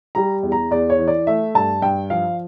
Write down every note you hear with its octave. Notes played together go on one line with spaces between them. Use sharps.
G3 A#5
E2
A#5
E2 D5
C#5
E3
D5
A3 E5
G2 A5
G2 G5
F3 F5